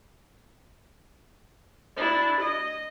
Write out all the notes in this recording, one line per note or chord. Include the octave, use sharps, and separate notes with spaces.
D4 E4
D#5